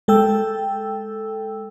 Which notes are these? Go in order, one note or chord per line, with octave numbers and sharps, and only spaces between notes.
G#3 A4 G5 E6